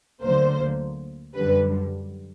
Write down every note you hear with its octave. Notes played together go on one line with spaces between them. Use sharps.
D2 D3 F#3 A#3 C5
F#2 D3 G3 B4